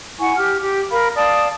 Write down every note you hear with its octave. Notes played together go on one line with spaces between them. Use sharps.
E4 F#5 G#5 C#6
G4 F6
G4
A#4 F5 B5
D5 F5 A5 D#6